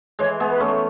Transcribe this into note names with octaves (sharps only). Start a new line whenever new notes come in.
E3 G#3 C#5
G#3 B3
B4
A3 C#4